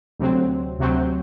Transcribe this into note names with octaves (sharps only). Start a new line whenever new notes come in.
D2 C3 F#3 C4
D2 C3 F#3 C4